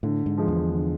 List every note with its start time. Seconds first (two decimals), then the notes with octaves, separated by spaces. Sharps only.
0.03 A2 D3
0.26 G#2
0.37 F3 G#3
0.48 E2
0.71 D3